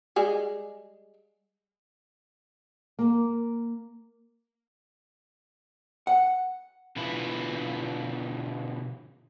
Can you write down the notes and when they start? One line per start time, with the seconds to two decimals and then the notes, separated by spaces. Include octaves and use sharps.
0.16 G3 G#3 G#4
2.99 A#3
6.07 F#5
6.96 B2 D3 E4 F4 B4